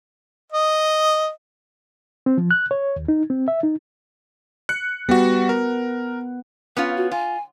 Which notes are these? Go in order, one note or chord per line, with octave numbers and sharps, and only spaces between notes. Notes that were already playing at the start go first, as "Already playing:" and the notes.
D#5
C4
F3
F#6
C#5
D#2
D#4
C4
E5
D#4
F#6 C#7
G3 B3 F#4
A#4
B3 C#4 F4 F5
F#4
F4 G#5